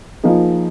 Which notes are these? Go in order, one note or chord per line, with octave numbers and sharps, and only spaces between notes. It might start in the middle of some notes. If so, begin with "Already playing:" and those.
F3 A#3 D#4 G#4